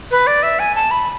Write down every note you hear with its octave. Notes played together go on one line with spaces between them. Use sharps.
B4
D5
E5
G#5
A5
B5